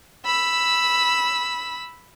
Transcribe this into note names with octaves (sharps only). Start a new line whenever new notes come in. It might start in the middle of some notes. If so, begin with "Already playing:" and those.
B5 E6